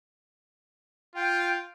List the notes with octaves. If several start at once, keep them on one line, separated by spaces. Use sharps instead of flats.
F4 G5